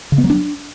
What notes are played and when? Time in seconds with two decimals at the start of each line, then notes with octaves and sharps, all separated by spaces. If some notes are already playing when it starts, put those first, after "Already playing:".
0.12 C#3
0.18 B3
0.24 F#3
0.30 D4